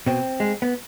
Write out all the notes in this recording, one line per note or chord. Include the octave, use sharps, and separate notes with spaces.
B2 C4
G#3
B3